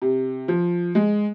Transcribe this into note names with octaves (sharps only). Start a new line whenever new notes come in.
C3
F3
G#3